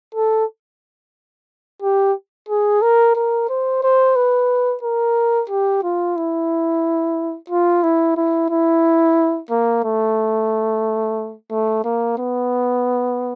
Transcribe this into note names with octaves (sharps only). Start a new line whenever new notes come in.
A4
G4
G#4
A#4
A#4
C5
C5
B4
A#4
G4
F4
E4
F4
E4
E4
E4
A#3
A3
A3
A#3
B3